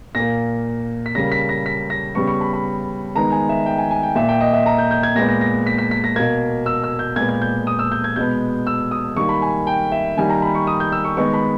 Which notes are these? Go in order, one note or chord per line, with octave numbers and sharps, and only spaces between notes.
A#2 A#3 A#6
B6
C#3 G3 A#3 A#6
B6
A#6
B6
A#6
C#3 G3 B3 C#6
C#6
B5
B5
D#3 G#3 B3 A#5
G#5
E5
G5
G#5
G#5
G5
A#2 A#3 E5
G5
D#5
E5
A#5
G6
G6
G#6
A#2 G#3 B3 A#6
A#6
A#6
B6
B6
B6
A#6
B2 A#3 G#6
E6
E6
G6
A#2 G#3 B3 G#6
G#6
G6
D#6
E6
G6
G#6
B2 G#3 B3 G6
E6
D#6
D#3 G3 A#3 C#6
B5
G#5
G5
E5
D#3 G3 A#3 G#5
A#5
B5
C#6
D#6
G6
E6
C#6
D#3 G#3 B3 C#6
B5